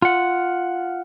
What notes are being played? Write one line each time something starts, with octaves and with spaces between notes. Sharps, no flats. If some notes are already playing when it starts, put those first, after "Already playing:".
F4 F#5